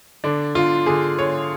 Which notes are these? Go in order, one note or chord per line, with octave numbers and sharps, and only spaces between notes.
D3 D4
D3 F4
D3 G#4
D3 C#5